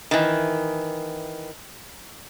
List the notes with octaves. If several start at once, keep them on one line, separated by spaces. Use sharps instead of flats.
D#3 E3